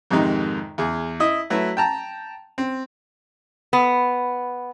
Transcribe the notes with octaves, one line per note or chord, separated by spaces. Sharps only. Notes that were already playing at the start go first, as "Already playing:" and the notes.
F2 G#2 C3 D#3 D#4
E2 G#4
E4 D#5
F#3 A3 E4 B4
G5 A5 A#5
C4
B3